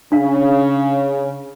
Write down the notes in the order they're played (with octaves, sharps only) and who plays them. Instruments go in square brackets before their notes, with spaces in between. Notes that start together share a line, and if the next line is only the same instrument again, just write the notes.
[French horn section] C#3 [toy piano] D4 F5